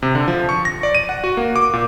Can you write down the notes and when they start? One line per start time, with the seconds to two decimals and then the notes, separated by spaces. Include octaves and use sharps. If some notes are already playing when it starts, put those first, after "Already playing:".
0.02 C3
0.15 D3
0.28 F3
0.49 C#6
0.65 A#6
0.83 D5
0.95 D#7
1.09 F#5
1.24 F#4
1.37 A#3
1.56 D6
1.73 A#2